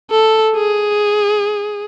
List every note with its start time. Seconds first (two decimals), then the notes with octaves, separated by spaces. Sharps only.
0.11 A4
0.56 G#4